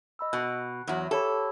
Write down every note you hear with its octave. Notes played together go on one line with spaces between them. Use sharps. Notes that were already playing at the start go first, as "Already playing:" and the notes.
D#5 B5 E6
B2 F#6
E2 F#3
G4 A4 C#5 B5